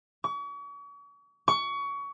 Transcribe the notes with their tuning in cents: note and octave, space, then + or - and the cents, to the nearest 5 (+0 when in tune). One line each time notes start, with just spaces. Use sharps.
C#6 +40
C#6 +25